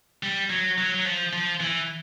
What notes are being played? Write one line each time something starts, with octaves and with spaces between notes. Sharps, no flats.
G3
F#3
F#3
F#3
F3
F3
E3